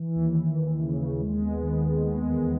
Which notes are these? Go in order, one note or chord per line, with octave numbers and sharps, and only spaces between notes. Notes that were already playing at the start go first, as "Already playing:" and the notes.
Already playing: E3
D#2
D#2
D#2
C#3
D#2
G#3
B3
D#3
D#3
G#3
E2